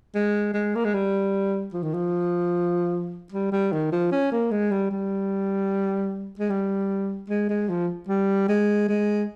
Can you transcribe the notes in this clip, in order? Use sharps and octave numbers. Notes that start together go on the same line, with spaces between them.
G#3
G#3
A#3
G#3
G3
F3
D#3
F3
G3
G3
D#3
F3
C#4
A#3
G#3
G3
G3
G#3
G3
G#3
G#3
F3
G3
G#3
G#3